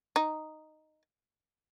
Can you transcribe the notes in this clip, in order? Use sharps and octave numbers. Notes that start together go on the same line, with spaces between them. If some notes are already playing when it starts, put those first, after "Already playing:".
D#4